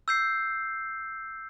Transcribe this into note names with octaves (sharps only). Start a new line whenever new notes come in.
E6 G6 C7